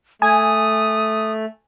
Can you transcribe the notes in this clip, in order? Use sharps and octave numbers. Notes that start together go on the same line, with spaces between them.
A3 G#5 D#6